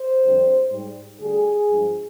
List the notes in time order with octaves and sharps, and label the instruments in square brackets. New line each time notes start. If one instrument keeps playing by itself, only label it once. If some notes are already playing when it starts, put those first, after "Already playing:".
Already playing: [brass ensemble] C5
F2 D3 G3
G#2 G3
D2 D3 G3 G#4
G2 F3 G#3